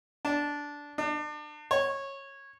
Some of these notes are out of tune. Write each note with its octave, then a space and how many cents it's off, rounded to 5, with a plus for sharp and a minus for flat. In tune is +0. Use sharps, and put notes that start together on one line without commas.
D4 -10
D4 +35
C#5 -15